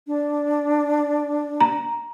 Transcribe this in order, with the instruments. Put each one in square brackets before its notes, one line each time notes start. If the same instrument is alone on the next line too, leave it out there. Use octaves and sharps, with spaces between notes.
[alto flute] D4
[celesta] A#5